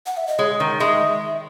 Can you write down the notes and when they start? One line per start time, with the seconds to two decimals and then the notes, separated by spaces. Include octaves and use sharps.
0.06 F#5
0.17 E5
0.28 D#5
0.39 G#3 C#5
0.60 D#3
0.80 G#3 E5